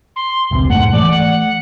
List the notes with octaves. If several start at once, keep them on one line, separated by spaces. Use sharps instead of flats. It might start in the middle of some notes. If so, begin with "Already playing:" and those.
C6
F1 C#2 C3
E1 G#2 A3 F#5
E3 A3 D5
F#5